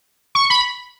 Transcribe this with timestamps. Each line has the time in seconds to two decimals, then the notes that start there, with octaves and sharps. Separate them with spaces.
0.35 C#6
0.50 B5